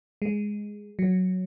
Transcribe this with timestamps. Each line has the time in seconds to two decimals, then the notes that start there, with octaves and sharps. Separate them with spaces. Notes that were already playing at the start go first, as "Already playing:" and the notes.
0.22 G#3
0.99 F#3